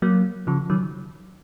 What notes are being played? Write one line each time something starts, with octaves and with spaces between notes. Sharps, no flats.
F#3 A#3
C#3 F3
D#3 F#3